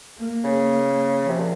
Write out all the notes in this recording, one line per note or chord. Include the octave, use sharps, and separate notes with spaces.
A#3
C#3
A#3
F3
C3
A#2